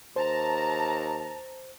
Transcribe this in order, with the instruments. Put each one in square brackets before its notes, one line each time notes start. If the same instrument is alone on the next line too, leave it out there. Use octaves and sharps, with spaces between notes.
[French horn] D#2 [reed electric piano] C5 [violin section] A5 A#5